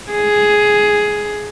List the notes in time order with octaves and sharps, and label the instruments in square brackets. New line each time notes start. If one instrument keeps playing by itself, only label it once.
[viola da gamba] G#4